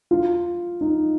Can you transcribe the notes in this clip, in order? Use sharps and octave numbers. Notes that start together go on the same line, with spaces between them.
F4
D#4